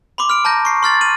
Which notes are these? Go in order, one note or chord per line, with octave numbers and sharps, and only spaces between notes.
B5 C6 D6
F6 D7
A5 A#5 G6 A#6
C#6 C7
C6 F6 A6 F#7
F6 D#7 F#7